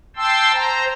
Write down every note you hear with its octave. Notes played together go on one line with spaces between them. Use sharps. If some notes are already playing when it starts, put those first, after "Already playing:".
G5 A5 C6 E6
C5 A#5